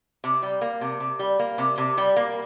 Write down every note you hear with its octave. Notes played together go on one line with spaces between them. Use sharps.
C3
G3
A#3
C3
C3
G3
A#3
C3
C3
G3
A#3